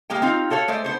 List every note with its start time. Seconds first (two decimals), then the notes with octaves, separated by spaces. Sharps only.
0.10 G#3 A#3 G4 G5
0.22 C4 D#4 F4 F5
0.50 F#4 A4 C#5 F5
0.68 G#3 A3 C5 D5
0.84 B3 D4 C5 C#5